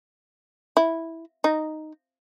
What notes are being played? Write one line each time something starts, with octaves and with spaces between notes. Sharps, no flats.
E4
D#4